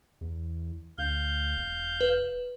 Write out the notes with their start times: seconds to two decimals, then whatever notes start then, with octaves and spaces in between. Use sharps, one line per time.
0.21 E2
0.98 D2 F5 G6
1.57 E1
2.01 B4